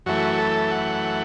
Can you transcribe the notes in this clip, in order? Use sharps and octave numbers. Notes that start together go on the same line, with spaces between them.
F#2 E3 A3 F#4
A4
F#5